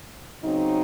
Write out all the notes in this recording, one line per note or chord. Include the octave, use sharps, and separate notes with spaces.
C#3 F#3 C4 D#4